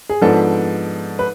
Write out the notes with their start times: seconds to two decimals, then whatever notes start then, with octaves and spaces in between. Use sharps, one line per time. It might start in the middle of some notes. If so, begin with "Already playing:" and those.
0.09 G#4
0.21 G#2 F3 B3 D4 A4
1.19 B4